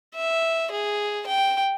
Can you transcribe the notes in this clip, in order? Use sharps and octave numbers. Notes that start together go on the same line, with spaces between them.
E5
G#4
G5